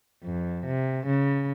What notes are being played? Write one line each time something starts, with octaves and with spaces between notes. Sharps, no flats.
F2
C3
C#3